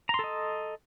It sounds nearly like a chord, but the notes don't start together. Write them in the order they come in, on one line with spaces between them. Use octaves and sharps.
A#5 C6 A4 D#5